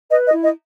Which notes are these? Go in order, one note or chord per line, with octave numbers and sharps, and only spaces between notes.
B4 D#5
D#5
E4
D#5